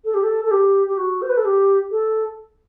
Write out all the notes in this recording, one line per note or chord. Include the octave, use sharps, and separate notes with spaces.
A4
G4
A4
A4
G4
G4
F#4
C5
B4
A4
G4
A4